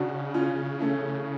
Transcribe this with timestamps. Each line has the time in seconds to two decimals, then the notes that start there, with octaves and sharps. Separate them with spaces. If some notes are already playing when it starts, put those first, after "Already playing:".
Already playing: C#3 D4 F#4
0.34 C#4 F4
0.80 A3 C#4